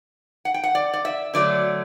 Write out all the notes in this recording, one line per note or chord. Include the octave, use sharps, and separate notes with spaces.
F#5
G5
F#5
D5
D5
E5
D3 F#3 A3 D5